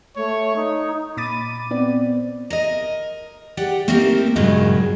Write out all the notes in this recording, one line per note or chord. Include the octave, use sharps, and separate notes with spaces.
A3 C#5
D#4
A#2 B5 D6 A6 D#7
B3 C4 D5
A#4 D#5
G4 D5 F#5 G5
A3 A#3 C4 D#4 G4 A#4
G2 A#2 C#3 F#3 G#3